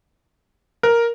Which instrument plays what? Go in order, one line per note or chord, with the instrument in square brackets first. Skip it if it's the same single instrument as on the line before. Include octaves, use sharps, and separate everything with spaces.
[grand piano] A#4